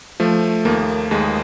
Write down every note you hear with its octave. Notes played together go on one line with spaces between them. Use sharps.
F3 A3
D#2 A#3
D#2 G#3